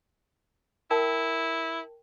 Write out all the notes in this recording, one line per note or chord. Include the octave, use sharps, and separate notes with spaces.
E4 A#4 G5 A5